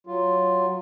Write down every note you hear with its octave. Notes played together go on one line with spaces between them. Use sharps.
F#3 F4